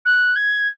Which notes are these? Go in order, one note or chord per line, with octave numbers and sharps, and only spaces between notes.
F#6
G#6